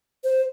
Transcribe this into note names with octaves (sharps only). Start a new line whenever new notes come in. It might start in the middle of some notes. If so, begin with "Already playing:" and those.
C5